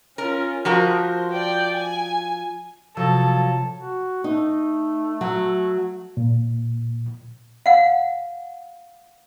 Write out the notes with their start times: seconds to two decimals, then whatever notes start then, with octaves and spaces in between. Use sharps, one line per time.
0.18 C#4 F4 A#4
0.65 F3 F#4 G4 A#4 C5
0.98 C5
1.33 D5 G5
1.75 G#5
2.97 C3 F3 F#3 A4
3.77 F#4
4.24 A3 D#4
5.21 F#3
6.17 A#2
7.66 F5 F#5